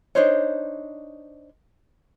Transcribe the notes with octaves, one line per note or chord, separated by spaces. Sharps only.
D4 D#4 C5 C#5